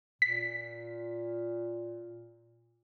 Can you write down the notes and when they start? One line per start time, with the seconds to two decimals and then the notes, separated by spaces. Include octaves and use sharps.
0.22 A#2 B6